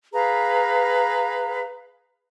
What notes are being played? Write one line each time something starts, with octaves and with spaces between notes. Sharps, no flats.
G#4 B4 F5 A#5